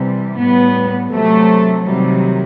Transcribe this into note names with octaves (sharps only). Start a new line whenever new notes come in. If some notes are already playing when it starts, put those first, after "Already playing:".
Already playing: C3 E3 G3
A2 G3 B3
C3 F#3 A3
C3 D#3 F#3 G3